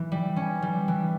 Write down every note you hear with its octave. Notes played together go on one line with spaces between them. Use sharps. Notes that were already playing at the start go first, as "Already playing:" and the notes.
Already playing: E3
G3
C#4
G3
E3